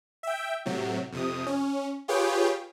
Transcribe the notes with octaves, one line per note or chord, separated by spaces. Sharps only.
E5 G5
A2 C3 F#3
F2 C3 D#6
C#4
F4 G4 G#4 B4 C#5 G5